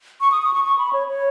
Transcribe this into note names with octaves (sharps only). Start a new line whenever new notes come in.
C#6
D#6
D#6
C#6
C#6
B5
C#5
C#5